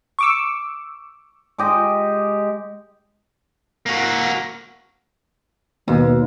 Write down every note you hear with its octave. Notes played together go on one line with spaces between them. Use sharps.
C#6 D6 E6
G#3 G4 D#5
A#3 F#4
D#2 B2